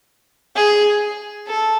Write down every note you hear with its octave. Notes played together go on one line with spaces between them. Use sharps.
G#4
A4